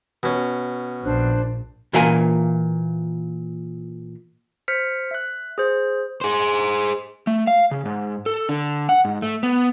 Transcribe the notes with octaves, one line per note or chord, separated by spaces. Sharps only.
B2 C#4
A#1 D4 C5 F#6
A#2 E3 F4 A#4 G#5
C5 F6 B6 C#7
E5 F#6
G#4 C5
G#4 C5
A3
F5
C#3
G#2
A4
D3
F#5
G#2
A3
B3